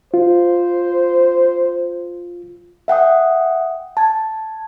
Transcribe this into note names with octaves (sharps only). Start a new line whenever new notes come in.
F4 C5
E5 F#5 G5 D#6
A5 G#6